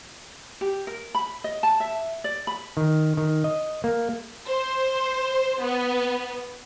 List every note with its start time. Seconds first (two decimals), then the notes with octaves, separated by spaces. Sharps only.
0.61 G4
0.87 A#4
1.15 B5
1.44 D#5
1.63 A5
1.80 E5
2.24 D5
2.47 B5
2.77 D#3
3.17 D#3
3.44 D#5
3.84 A#3
4.47 C5
5.62 B3